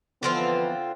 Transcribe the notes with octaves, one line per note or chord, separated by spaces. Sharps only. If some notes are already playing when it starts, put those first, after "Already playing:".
D3 E3 F3 B3 C4 F4